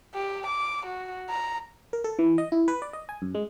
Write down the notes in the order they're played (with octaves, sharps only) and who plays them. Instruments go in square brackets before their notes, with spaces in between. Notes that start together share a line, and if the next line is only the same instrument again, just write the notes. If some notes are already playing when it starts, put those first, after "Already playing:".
[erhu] G4
D6
F#4
A#5
[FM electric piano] A#4
A4
E3
D#5
E4
B4
D5
D#5
G#5
F#2
G#3